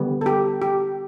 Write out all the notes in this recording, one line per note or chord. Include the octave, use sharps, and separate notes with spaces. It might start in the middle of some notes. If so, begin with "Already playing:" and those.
Already playing: D3 G3 B3
A4
G4
G4